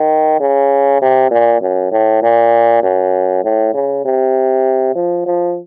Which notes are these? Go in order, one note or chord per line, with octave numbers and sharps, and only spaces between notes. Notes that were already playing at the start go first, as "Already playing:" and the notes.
Already playing: D#3
C#3
C3
A#2
F#2
A2
A#2
F#2
A2
C#3
C3
F3
F3